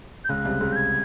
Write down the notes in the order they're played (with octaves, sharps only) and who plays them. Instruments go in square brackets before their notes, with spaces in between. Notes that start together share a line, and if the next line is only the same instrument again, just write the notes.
[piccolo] G6
[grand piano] C#2 C#3 [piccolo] F#6
[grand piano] C2 C3
C#2 C#3
[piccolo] G6
G#6